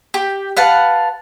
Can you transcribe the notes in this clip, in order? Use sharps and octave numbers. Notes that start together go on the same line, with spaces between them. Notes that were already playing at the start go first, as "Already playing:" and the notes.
G4
B4 F5 F#5 A5